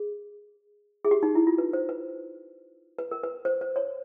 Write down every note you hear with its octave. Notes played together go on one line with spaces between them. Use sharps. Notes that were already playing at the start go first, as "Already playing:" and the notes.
Already playing: G#4
G#4
G4
D#4
E4
F4
B4
C5
B4
B4
A#4
B4
C5
C5
C#5